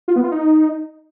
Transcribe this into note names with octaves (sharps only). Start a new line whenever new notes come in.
F4
B3
F4
D#4